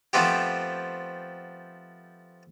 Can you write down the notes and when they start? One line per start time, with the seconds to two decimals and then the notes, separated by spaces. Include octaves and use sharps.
0.13 F3 A3 B3 C4 G4